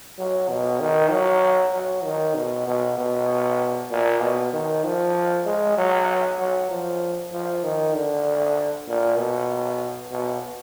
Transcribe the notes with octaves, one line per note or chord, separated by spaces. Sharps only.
F#3
B2
D#3
F#3
F#3
D#3
B2
B2
B2
A#2
B2
D#3
F3
G#3
F#3
F#3
F3
F3
D#3
D3
A#2
B2
B2